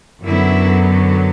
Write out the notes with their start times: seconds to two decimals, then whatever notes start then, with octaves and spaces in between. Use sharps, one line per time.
0.23 F#2 D3 F#3 B3 E4